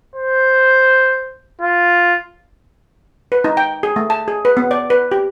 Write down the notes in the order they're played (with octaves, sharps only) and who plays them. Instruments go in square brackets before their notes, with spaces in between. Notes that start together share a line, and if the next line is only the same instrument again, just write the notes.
[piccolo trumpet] C5
F4
[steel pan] B4
D#4
G5
G#4
A3
A5
G#4
B4
B3
D5
B4
G4